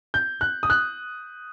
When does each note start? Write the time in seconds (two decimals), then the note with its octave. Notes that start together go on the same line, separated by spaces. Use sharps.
0.14 G6
0.41 F#6
0.63 D#6
0.70 F#6